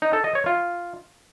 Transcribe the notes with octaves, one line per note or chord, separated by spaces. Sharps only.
D#4
A4
D#5
C#5
F4